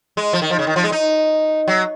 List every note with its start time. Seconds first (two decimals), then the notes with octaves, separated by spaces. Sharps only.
0.17 G#3
0.33 F3
0.42 D#3
0.50 F3
0.59 C#3
0.67 D#3
0.76 F3
0.84 G#3
0.92 D#4
1.68 F#3